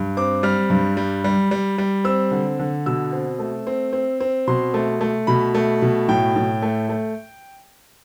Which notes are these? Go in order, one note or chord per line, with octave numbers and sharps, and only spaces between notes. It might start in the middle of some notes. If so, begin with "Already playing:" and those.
Already playing: G2
C4 D6
G3 F6
G2
G3
G3
G3
G3
C4 E6
D3
D3
B2 E6
C4
A3
C4
C4
C4
B2 C6
A3
A3
B2 B5
A3
B2
A2 G5
A2
A3
A3